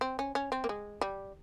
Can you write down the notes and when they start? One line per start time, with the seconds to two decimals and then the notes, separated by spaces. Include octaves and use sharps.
0.01 C4
0.19 C#4
0.35 C#4
0.52 C4
0.64 A#3
0.69 G#3
1.01 G3